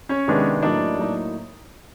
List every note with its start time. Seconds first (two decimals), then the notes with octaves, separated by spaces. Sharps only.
0.09 C#4 C#5
0.28 C3 D#3 G#3 B3 D4
0.62 A2 F#3 A#3 D4 D#4 D5
0.98 A2 F#3 A#3 D#4